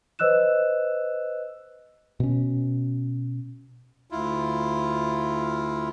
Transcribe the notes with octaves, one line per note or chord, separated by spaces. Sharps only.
B4 C5 D#5 E6 F#6 E7
B2 C#4
D2 E4 F4